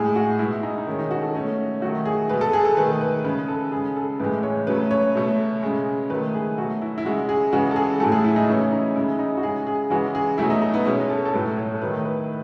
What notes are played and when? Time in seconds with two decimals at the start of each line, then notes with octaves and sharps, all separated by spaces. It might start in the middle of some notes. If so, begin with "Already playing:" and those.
Already playing: A2 G#3 G#4
0.16 F#4
0.39 B2 G#3 E4
0.63 D#4
0.78 D#4
0.87 D#3 G#3 C#4
0.99 D#4
1.11 F#4
1.22 A4
1.34 B2 A3 C#4
1.81 D#3 F#3 A3 F#4
2.06 G#4
2.29 B2 G#3 B4
2.41 A4
2.53 G#4
2.65 A4
2.77 D#3 A3 B4
3.01 B4
3.24 C#3 G#3 B4
3.48 A4
3.72 C#3 G#3 G#4
3.96 A4
4.19 A2 E3 G#3 B4
4.43 C#5
4.67 C#3 F#3 A3 B4
4.91 C#5
5.15 B2 A3
5.63 C#3 G#3
6.10 D#3 F#3 A3 B4
6.34 G#4
6.58 B2 F#3 A3 F#4
6.82 E4
6.98 E4
7.05 C#3 G#3 F#4
7.29 G#4
7.52 C#3 E3 G#3 F#4
7.71 A4
7.76 G#4
8.00 A2 F#3 A3 A4
8.12 G#4
8.24 E4
8.36 D#4
8.48 C#3 E3 A3 C#4
8.72 D#4
8.95 C#3 G#3 E4
9.19 D#4
9.37 F#4
9.43 C#3 G#3 G#4
9.67 G#4
9.90 C#3 E3 G#3 F#4
10.15 G#4
10.38 B2 F#3 A3 E4
10.50 D#4
10.61 D#4
10.74 B3
10.86 B2 G#3 C#4
11.10 A4
11.25 A4
11.33 A2 F#3 A3 B4
11.57 C#5
11.75 A4
11.81 D#3 F#3 A3 B4
12.05 B4